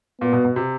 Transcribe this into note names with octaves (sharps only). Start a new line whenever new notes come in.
A#2 B3
B2
B2
C3